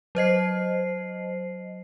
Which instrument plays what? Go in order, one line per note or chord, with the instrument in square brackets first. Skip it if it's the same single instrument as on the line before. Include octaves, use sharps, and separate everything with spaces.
[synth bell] F#3 C5 D#5 C7